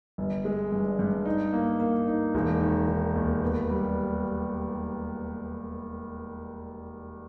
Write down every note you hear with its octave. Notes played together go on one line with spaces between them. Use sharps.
G1
G#3
G2
G2
D#4
A#3
A#3
D#4
E1
D#3
D#3
D#2
B3
G3